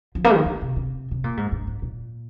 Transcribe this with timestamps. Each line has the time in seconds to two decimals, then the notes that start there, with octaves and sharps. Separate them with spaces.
0.15 F3
0.24 A#3
0.35 D#3
0.46 D3
0.61 C3
0.76 C3
1.11 C3
1.24 A#2
1.37 G#2
1.52 G2
1.67 G#2
1.82 A#2